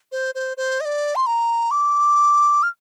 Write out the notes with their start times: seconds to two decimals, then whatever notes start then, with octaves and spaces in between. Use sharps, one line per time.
0.12 C5
0.35 C5
0.57 C5
0.80 D#5
0.85 D5
1.15 C6
1.26 A#5
1.71 D6
2.63 F6